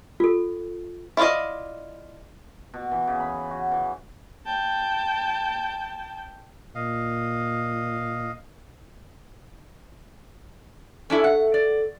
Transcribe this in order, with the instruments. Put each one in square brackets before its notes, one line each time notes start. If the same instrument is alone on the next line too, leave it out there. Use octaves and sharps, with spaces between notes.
[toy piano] F4 A4
[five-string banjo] E4 F4 B4 D5 D#5
[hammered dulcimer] B2
E3
C#3
B5
F#4
E3
[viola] G5 A5
[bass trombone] A#2 [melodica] D#5 F5
[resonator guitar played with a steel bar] C#4 D4 E4 [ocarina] A4
[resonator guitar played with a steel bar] F#5
D5